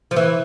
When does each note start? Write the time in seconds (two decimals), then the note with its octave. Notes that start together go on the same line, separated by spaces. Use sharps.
0.11 F3
0.16 E3